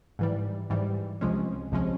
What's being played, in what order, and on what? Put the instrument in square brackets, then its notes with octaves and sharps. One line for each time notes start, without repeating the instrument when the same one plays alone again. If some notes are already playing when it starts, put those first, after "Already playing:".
[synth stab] G#2 E3 G3
G#2 E3 G3
C#2 C3 F3 G#3 C#4
C#2 C3 F3 G#3 C#4